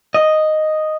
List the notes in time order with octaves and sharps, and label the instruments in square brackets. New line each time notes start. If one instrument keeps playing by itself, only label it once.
[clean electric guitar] D#5